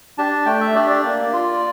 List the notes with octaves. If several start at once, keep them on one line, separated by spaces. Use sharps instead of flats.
D4 G4 A5
A3 G5
E5
D4 G4 D5
D5
A#3
F4